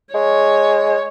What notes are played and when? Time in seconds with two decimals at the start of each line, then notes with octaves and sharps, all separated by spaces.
0.14 G#3 C#5